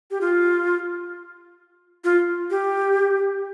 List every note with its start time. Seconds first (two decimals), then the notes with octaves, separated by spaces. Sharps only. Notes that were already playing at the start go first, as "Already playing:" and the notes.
0.11 G4
0.21 F4
2.04 F4
2.50 G4